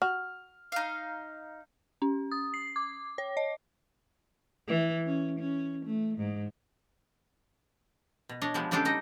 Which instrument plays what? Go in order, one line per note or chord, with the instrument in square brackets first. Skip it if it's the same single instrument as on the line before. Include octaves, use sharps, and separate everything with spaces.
[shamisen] F#4 [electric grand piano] F6
[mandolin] D#4 F5
[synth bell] C#4
D#6
C7
D6
C#5
D#5
[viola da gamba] E3
C#4
C#4
A3
G#2
[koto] B2
D4 C#5 D#5
F3 G3 G#3 B3
C#3 G3 G#3 D4 G4 A4
G3 D#4 D#5